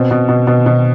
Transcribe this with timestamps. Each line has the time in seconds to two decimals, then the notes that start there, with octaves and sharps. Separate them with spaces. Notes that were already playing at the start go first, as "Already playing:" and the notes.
Already playing: B2 C4
0.11 B2
0.29 B2
0.47 B2
0.66 B2